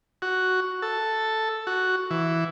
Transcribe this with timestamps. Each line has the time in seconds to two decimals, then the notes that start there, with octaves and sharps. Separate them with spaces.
0.22 F#4
0.82 A4
1.67 F#4
2.11 E3